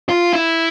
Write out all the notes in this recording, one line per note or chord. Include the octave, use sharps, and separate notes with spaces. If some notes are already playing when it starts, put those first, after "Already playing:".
F4
E4